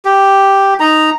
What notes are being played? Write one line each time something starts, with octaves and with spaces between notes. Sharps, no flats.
G4
D#4 A#5